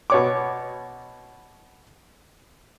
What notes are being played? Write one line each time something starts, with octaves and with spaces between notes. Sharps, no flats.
B2 C#5 D6